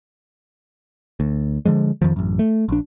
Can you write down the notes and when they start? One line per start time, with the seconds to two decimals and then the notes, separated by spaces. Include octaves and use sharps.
1.20 D2
1.66 D3 E3 F3 G#3
2.02 F2 D#3 F3
2.16 A1 F#2
2.39 A3
2.68 A#1 D4